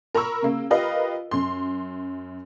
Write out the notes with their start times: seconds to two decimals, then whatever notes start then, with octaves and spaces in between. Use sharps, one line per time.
0.15 A#4 A#5 B5 C#6 E6
0.42 C#3 A#3
0.70 F4 G4 A#4 B4 D#5 F5
1.31 F#2 C6